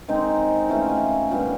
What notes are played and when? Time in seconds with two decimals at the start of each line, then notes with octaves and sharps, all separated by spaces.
0.08 D#3 G#3 C4 D#4
0.69 E3 A3 C#4 F4
1.31 A#2 G3 B3 D4